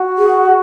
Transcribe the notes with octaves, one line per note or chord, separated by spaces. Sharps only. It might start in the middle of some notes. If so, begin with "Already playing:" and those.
Already playing: F#4
G#4